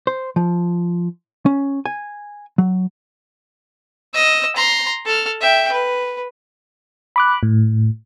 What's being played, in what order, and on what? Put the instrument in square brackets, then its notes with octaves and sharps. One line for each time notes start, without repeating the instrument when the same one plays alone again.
[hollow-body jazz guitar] C5
F3
C#4
G#5
F#3
[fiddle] D#5 E6
A#5 C6
A4 F6
E5 G5
B4
[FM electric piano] B5 D6 F#6
A2